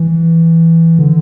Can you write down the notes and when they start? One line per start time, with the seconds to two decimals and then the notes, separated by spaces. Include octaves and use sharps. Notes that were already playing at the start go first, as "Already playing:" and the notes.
Already playing: E3
0.99 D3